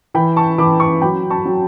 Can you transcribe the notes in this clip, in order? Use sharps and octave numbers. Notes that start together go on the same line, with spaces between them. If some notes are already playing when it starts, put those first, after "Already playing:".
E3 G5 B5
A5 C#6
E3 B5 D6
A5 C#6
F#3 G5 B5
A5 C#6
F#3